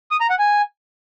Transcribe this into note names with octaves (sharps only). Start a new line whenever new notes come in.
D#6
A#5
F#5
G#5